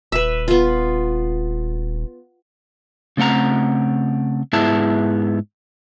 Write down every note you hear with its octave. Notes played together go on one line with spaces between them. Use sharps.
D#1 B4 E5
B3 F4
C#3 A3 C4 F#5 A#5
G#2 B3 E4 G#4 E5 A5